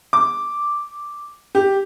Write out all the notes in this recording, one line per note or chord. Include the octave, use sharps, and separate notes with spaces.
D6
G4